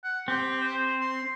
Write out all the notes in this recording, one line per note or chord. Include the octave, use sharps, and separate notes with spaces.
F#5
C4 G4
C5
C6